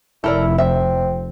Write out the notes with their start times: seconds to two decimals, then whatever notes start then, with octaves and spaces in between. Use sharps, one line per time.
0.24 F1 E4 A4 A#4 D5
0.58 C4 E5